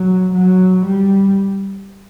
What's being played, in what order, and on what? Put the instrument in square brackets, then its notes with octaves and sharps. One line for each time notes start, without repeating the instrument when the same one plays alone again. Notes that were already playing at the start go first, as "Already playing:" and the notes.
Already playing: [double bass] F#3
F#3
G3